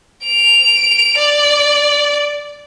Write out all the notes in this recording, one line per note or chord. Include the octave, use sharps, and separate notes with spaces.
D7 F7
D5